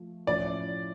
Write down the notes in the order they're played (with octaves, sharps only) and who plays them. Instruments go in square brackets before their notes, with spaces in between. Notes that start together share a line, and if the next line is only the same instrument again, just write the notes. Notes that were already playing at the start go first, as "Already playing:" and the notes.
Already playing: [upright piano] F3 A3
[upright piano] A2 F3 C#4 E4 [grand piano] D5